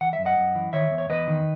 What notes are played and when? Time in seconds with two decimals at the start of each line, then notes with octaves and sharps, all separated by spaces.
0.01 E3 F#5
0.13 E5
0.19 F#2
0.25 D#5 F#5
0.38 F#2
0.55 E3
0.73 D#3 C#5 E5
0.92 E2
0.98 C#5
1.10 E2 B4 D#5
1.28 D#3